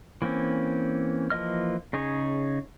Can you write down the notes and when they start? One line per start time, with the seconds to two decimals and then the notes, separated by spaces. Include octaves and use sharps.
0.22 E3 A#3 C4 C#4
1.30 E3 F3 A#3 D#5 F6
1.93 C#3 D#4 G#4 C#5